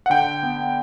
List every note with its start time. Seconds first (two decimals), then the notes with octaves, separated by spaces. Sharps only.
0.06 F#5
0.10 D3 G5
0.43 B3